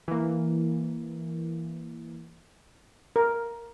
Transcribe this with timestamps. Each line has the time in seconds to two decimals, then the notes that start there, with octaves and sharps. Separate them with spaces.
0.08 E3 A#3
3.16 A#4